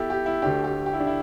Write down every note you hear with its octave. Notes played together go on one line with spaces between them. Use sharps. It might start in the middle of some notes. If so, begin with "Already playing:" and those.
Already playing: B2 E4 G4 A4
G4
E4
D2 D3 A3 D4 G4
G4
G4
E4
D4
E4